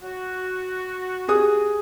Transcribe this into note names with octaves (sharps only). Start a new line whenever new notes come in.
F#4
G4 G#4 D#6